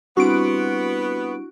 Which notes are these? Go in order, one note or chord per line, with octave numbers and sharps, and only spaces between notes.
G3 B3 C4 D4 E4 F#4 D7